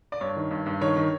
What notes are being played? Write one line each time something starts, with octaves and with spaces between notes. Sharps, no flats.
D5
G2 C#5
D#3
G2
G2
D#3 C#5
D#3